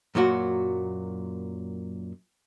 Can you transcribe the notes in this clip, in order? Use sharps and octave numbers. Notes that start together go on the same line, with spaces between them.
F#2 A#2 F#3 F#4